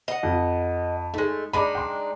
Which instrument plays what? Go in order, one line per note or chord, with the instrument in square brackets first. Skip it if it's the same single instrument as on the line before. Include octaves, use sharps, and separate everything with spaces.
[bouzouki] D#5 F#5
[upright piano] F2
[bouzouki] G#3 A3 [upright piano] D#4
[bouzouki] G#3 D4 D#4 [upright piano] B5 D6
[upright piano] G5 C6